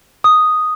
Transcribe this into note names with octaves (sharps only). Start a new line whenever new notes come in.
D#6